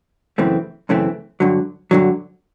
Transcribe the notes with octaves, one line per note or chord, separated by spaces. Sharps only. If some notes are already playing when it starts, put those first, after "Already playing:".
F#2 C#3 E3 A3 C4
F#2 C#3 E3 A3 C4
G2 D3 F#3
G2 D3 F#3